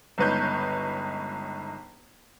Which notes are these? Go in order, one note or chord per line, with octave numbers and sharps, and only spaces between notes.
G1 C#2 D#4 B4 C#5 G6